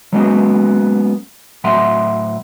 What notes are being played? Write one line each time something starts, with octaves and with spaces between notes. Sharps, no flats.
F#3 G#3 A#3 B3 C#4 F#4
A2 F#3 E5 F#5 C6